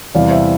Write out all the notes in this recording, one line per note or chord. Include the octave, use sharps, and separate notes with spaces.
E2 C3 E3 G3 D5 F5
C5 E5